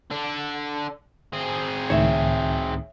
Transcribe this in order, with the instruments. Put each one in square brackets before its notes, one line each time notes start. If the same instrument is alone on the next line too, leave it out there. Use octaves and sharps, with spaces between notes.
[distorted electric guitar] D3 D4
C4 G#4
[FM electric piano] C#2 A2 D#3 [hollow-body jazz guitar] C#5 E5